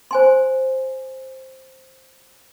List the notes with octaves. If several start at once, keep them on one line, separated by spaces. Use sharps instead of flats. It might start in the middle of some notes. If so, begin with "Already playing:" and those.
C5 G#5 C6